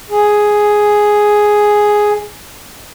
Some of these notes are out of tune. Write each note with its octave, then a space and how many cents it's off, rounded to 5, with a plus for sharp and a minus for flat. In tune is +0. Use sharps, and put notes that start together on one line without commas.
G#4 +5